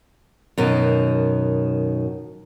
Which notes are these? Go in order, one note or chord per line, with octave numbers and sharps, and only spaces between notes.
F#2 B2 D#3